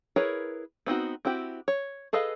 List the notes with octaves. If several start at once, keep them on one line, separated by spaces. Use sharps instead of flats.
E4 G#4 A#4 B4 C#5
B3 C4 D#4 F#4
C4 E4 F#4 G4
C#5
G#4 A4 B4 D#5 F5